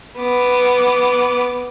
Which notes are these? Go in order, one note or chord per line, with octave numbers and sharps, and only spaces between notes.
B3 D6